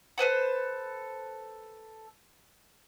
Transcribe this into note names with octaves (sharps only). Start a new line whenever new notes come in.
A4 B4 C5 F#5